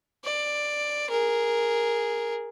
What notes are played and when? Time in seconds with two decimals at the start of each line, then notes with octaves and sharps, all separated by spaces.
0.25 D5
1.10 G#4 A#4